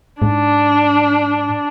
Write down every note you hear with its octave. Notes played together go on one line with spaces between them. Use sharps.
G#2 D4